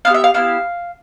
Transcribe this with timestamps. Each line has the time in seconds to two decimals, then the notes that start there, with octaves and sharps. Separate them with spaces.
0.05 B3 E4 F5
0.10 G4 E5
0.24 F5
0.34 B3 E4 G4 F5